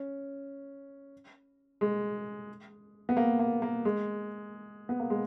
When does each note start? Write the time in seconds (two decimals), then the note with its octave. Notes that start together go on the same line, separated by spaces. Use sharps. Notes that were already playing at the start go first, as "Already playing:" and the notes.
Already playing: C#4
1.81 G#3
3.09 B3
3.17 A#3
3.39 A#3
3.62 A#3
3.85 G#3
4.89 B3
5.00 A#3
5.10 G#3